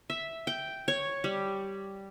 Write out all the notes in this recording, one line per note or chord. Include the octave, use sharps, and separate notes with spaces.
E5
G5
C#5
G3